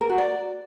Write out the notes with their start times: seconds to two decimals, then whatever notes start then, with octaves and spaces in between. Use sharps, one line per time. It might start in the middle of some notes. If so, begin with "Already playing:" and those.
0.01 A#4
0.09 F#4
0.18 D5